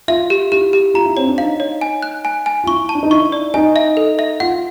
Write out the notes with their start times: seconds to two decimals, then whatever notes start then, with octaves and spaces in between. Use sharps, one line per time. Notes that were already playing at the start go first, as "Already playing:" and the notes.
0.08 F4 E5
0.30 G4
0.52 E4 G4
0.73 G4
0.94 F4 A#5
1.06 E4
1.17 C4 C#5
1.27 D4
1.38 D#4 F5
1.60 C#5
1.81 G#5
2.02 F#6
2.25 G#5
2.46 G#5
2.64 F4
2.67 E4 C#6
2.89 A5
2.95 D4
3.03 D#4
3.11 E4 C#6
3.32 D5
3.54 D#4 G#5
3.76 E5
3.97 A4
4.19 E5
4.40 F4 F#5